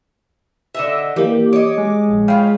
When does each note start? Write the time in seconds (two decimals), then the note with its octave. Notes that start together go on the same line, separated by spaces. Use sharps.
0.74 D3 D#5 E5
1.16 E3 A#3 G4
1.53 C#5 D#5 D6
1.78 G#3
2.09 A#1
2.28 C#4 F4 F5 G5 B5